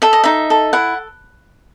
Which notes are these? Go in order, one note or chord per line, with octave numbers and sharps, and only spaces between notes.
A4 E5
D#5
D#4 E5
A4
E4 F#5